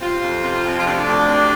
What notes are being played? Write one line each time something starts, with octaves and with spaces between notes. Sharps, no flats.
C3 C4 F4
F2
C3
F2
F4
C3 A3 D4
D2
C3